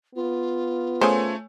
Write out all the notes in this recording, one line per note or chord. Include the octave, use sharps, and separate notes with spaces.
B3 F4
C#3 A3 C5 C#5 G#5